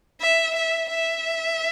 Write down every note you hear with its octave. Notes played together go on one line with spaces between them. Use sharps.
E5
E5
E5